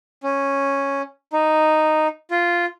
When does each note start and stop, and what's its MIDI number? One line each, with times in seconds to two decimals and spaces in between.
0.23 1.02 61
1.33 2.07 63
2.31 2.66 65